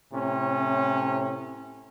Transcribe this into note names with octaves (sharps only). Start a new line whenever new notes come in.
A2 C3 C#4